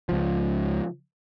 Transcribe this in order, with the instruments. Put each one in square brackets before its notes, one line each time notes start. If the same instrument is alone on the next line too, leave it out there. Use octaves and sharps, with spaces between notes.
[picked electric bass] C#2 F3